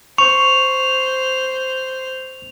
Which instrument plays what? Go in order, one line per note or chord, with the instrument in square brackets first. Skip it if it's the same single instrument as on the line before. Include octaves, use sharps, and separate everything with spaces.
[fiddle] C5 [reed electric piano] C#6 [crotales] F7